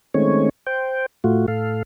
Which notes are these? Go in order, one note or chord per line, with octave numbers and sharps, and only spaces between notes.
D#3 G#3 A3 C4 C#4 C#5
C5 G5
A2 A3 F4 F#4
A2 A4 F5